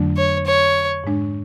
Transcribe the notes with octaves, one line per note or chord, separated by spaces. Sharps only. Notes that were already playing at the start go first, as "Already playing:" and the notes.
Already playing: F2 D3 F#3 A3 D4
C#5
C#5
G#2 G#3 D4